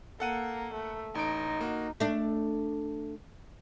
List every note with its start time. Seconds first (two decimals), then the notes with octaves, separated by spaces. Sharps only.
0.20 A#3 A4 F#5 D#7
0.74 A3
1.15 A1 D#4 D7
1.61 A#3 F#4
2.00 A3 D4